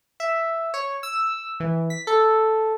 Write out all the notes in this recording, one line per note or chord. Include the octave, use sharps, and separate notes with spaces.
E5
C#5
E6
E3
B6
A4